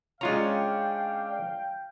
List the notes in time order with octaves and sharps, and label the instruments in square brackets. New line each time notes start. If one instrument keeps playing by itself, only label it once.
[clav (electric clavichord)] G#3 F4 A#5 [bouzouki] C#4 D4 [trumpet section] F5 G5